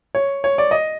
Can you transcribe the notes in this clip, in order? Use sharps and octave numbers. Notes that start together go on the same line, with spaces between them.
C#5
C#5
D5
D#5